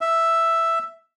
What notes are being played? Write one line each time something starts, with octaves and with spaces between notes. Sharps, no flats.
E5